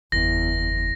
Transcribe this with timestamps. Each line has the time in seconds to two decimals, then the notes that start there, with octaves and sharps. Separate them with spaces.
0.12 F#1 E2 A#6